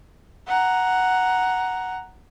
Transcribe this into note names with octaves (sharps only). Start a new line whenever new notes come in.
F#5 A#5